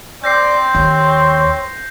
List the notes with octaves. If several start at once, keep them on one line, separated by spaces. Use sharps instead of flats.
C4 D5 G6 A#6 C7
D#2 C#5